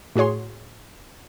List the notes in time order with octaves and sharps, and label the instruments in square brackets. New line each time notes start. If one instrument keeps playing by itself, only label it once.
[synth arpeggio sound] A2 F#4 G#4 C#5 C6